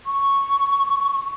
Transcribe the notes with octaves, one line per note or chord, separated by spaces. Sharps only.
C#6